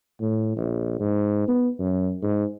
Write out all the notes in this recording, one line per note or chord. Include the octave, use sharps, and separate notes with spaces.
A2
A#1
G#2
B3
F#2
G#2